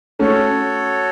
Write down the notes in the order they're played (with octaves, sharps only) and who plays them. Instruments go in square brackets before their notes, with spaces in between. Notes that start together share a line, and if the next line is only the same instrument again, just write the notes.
[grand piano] A3 C#4 [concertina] F#4 A4 C#5